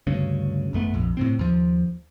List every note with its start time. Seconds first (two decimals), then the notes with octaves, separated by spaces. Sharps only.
0.07 D2 G2 C#3
0.73 G#1 F#2 A3 B3
0.94 A#1 F2
1.17 A2 C3 C4
1.39 D#2 F3